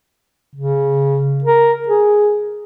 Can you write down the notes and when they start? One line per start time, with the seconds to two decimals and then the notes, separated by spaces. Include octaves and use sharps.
0.55 C#3
1.44 A#4
1.88 G#4